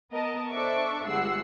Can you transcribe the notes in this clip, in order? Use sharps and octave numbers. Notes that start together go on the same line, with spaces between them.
B3 A#4 D#5 A5
D4 A4 C5 E5 C#6 D6
G1 G3 G#3 F#5 E6 C7